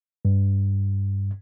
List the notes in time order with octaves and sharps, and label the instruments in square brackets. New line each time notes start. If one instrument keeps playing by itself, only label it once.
[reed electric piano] G2